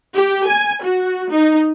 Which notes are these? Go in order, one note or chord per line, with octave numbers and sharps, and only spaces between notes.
G4
G#5
F#4
D#4